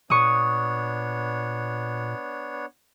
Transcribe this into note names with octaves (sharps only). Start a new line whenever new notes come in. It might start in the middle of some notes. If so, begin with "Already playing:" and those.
A#2 B3 D4 C#5 C#6 D#6